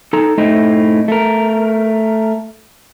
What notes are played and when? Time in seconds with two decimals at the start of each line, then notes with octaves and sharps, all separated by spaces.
0.13 D#4 A4 A#5
0.38 A2 A3 C4 D#4 E4
1.08 A3 A#4